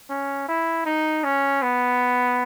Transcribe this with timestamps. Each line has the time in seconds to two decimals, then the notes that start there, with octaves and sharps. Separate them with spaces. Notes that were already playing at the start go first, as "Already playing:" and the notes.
0.10 C#4
0.48 E4
0.86 D#4
1.24 C#4
1.62 B3